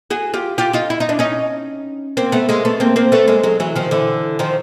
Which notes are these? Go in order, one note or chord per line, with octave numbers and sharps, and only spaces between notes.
F#4 G#4
F4 G4
F4 G4
D#4 F4
E4
D#4
D4
C#4 D#4
A#3 C4
A3 B3
G#3 A#3
A3 B3
A#3 C4
A#3 C4
A3 B3
G#3 A#3
F#3 G#3
E3 F#3
D#3 F3
D3 E3
D#3 F3